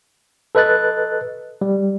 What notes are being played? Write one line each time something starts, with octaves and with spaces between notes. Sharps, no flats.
A4 B4 D#5 F#6 A6
G3